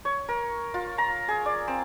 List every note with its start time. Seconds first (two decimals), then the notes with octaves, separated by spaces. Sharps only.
0.05 C#5
0.29 A#4
0.74 F4
0.98 A#5
1.28 G#4
1.46 D5
1.68 C4